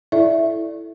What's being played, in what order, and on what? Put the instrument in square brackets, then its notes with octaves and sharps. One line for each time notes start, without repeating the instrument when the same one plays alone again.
[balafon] E4 A4 D5 E5